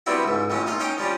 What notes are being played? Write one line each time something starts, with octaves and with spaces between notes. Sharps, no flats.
G3 B3 C4 D4 E4 F#4
C#2 G#2
F2 A2 F#3 C#4
A#1 D#4 F4 F5
C#4 D#4 C#5 G5
F3 G3 C#4 D4